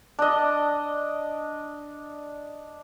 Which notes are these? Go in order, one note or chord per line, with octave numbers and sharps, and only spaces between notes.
D4 D#5